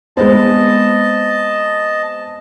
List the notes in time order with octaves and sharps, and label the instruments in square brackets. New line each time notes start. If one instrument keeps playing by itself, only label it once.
[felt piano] G#3 B3 C4 [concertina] D#5 A5